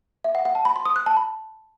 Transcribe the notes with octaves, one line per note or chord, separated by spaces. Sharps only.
E5
F#5
F#5
A5
B5
C6
D#6
F#6
A5
B5